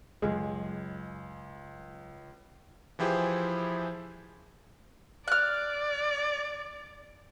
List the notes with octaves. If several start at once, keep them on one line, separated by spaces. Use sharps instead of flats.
C#2 F#2 F#3 G#3
E3 F3 E4 G4 G#4 C5
D5 F6 F#6